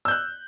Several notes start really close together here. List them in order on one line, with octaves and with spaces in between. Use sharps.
E6 G6 F#6